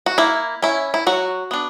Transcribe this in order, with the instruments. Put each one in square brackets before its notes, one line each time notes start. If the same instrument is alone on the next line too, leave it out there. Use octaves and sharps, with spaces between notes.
[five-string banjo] F#4
A#3 E4
C#4 E4
E4
F#3 F#4
B3 D4